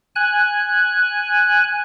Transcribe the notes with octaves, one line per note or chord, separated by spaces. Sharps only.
G#5 F#6